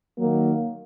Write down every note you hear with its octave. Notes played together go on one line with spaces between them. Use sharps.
D#3 F#3 A#3